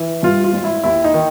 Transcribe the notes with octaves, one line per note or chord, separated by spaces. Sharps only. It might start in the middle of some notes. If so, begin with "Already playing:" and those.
Already playing: E3
G2 F4
F4
G#1
E4
D#2 E4
D#4
D#3